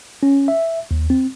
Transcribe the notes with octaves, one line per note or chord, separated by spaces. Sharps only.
C#4
E5
D#2
C4